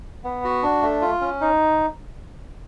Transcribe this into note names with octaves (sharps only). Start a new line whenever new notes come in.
B3
F#4
D4
A3
F4
C#4
D#4